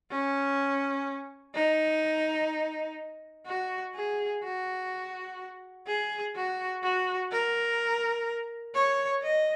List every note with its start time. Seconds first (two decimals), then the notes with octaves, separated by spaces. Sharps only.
0.11 C#4
1.55 D#4
3.46 F#4
3.95 G#4
4.44 F#4
5.87 G#4
6.35 F#4
6.83 F#4
7.32 A#4
8.75 C#5
9.23 D#5